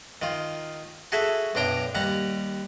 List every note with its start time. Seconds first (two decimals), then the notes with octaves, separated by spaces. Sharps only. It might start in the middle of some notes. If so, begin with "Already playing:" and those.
0.22 D#3 F4
1.12 F#4 G#4 A4 E5
1.55 B1 F#2 D4 G5 A#5
1.95 D#2 G3 F#5 A#5